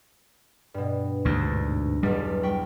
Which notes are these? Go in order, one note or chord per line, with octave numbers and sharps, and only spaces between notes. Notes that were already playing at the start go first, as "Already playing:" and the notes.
G2 B2
D2 G#2 C#6
B1 E2 G3
B4 G5 C#6